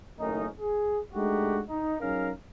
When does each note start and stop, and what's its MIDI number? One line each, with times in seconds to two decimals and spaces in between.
0.19 0.47 30
0.19 0.47 51
0.19 0.47 57
0.19 0.47 61
0.19 0.47 63
0.60 0.99 68
1.14 1.60 56
1.14 1.60 57
1.14 1.60 62
1.14 1.60 63
1.14 1.60 66
1.14 1.60 67
1.68 1.94 63
2.00 2.31 54
2.00 2.31 61
2.00 2.31 63
2.00 2.31 68
2.00 2.31 70
2.00 2.31 77